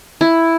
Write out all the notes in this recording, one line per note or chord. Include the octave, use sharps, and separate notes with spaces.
E4